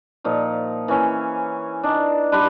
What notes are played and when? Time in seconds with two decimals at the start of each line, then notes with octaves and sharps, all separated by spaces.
0.24 A#2 F3 D#4
0.88 E3 A#3 C#4
1.83 D4 D#4
2.32 G3 D4 B4 C6